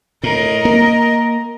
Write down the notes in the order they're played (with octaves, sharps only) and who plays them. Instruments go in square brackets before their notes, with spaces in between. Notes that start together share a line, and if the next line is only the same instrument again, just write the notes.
[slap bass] A2 [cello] A#4 D#5
[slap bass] A#3